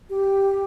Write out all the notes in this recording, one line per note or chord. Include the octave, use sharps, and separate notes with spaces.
G4